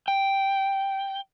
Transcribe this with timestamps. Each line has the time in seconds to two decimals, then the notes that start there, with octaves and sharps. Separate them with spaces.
0.08 G5